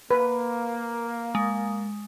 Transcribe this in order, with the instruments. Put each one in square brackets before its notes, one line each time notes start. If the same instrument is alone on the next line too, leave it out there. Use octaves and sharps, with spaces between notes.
[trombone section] A#3 [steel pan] B4
[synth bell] G#3